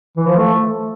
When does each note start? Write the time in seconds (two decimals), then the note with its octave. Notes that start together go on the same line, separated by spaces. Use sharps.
0.17 E3
0.27 F3
0.37 A3